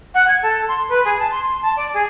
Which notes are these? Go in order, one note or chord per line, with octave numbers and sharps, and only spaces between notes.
F#5
G#6
A4
C6
B4
G#4
A5
C6
A5
D5
G#4